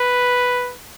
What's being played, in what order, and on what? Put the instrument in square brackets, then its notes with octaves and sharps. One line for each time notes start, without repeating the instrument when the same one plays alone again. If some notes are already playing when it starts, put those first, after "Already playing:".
Already playing: [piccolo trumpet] B4